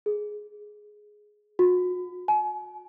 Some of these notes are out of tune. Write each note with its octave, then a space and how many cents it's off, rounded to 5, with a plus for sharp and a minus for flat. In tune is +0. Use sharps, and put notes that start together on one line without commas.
G#4 +10
F#4 -40
G#5 +35